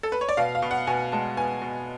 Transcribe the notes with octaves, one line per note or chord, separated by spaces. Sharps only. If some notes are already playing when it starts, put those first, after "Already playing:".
A4
B4
C#5
D5
B2 F5
F5
B2
F#5
B2 G#5
G#3 A5
B3 G#5
B2